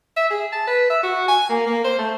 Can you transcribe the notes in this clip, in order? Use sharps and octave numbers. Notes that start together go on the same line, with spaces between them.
E5
G#4
A5
B4
E5
F#4
G#5
A#3
A#3
C5
A3